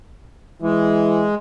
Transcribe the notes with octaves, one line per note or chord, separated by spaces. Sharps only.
E3 G#3